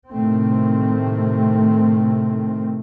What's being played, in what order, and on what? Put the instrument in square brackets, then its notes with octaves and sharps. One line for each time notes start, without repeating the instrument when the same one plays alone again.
[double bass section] A2 C3 D#3 A3 C4